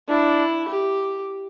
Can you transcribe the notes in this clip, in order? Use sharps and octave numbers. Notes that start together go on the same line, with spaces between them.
D4 E4
G4